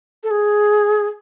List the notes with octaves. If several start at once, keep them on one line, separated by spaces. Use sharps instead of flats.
A4
G#4